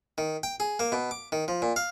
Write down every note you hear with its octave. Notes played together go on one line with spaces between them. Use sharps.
D#3
G5
G#4
A#3
B2
D6
D#3
F3
A#2
F5